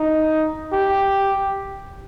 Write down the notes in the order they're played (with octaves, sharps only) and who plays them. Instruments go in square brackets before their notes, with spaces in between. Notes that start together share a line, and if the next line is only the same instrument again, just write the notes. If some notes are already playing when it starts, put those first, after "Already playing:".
Already playing: [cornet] D#4
G4